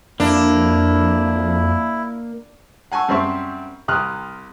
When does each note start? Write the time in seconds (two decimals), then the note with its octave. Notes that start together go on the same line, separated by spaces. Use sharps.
0.20 F2 A#3 D4 E4
2.92 F#5 G#5 A5 C#6 E6
3.08 F#2 G3 C4 E5 C#6
3.88 C2 C3 D#6 F6 F#6